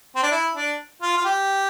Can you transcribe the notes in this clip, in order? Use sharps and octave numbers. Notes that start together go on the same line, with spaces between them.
C4
D4
E4
D4
F4
F4
G4